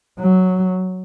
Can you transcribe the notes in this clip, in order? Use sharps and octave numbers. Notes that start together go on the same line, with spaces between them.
F#3